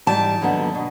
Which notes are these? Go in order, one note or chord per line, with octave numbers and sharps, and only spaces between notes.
G#2 E3 G3 A5
D#2 D3 F#3 B3
B2